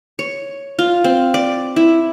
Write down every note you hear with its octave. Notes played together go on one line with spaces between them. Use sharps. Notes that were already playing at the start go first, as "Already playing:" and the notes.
C#5
F4
C4
D5
E4